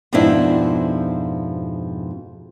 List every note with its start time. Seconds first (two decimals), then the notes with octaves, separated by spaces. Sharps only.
0.13 F2 G#2 B2 F3 D4 E4